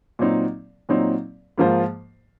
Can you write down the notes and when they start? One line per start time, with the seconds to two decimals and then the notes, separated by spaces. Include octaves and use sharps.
0.19 A#2 F#3 C4 D#4
0.89 A#2 F#3 C4 D#4
1.58 G#2 F3 A#3 F4 C5